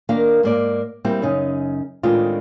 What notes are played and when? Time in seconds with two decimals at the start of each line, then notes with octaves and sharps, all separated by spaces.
0.09 D#3 A#3 D4 A#4 F5
0.43 G#2 A#3 D5
1.05 G3 A#3 C4 E4
1.22 F#2 C#3 D#4
2.03 A2 D#3 G#3 C4 D4 F4